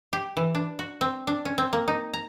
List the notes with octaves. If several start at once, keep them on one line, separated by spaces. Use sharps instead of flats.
G4
E3
D4
F#4
C4
D4
C#4
C4
A#3
D#4
A#5